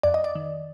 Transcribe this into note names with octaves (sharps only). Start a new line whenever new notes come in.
F2 D5
D#5
D5
D#3